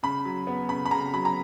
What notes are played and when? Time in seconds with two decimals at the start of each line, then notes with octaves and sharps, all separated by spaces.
0.03 C#3 B5
0.25 F#3
0.47 B3
0.69 C#3 B5
0.86 B5
0.91 C#3 A#5
1.13 F#3 B5
1.25 A#5